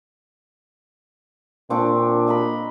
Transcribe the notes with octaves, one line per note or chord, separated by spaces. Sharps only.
A#2 C4 D4 C#6
D#5 A#5 B5